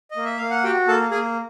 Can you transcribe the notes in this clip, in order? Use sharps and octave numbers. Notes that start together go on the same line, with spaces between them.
D#5
A#3
E5
A#3 F5
F#5
F#4 G4 G5
A#3 A4 A5
A#3 G#4 G#5